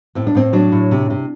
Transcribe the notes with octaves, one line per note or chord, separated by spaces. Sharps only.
A2 C4
D4
A2 C4
F#3 D4
A2
C3
C3